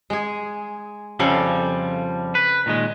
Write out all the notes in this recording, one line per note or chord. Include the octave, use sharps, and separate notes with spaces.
G#3 G#4
F2 C#3 F3 G3 A4 F5
B4
A#2 D#3 G#3